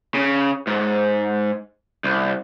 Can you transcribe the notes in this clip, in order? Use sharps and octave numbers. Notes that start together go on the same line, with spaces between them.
C#3
G#2
C2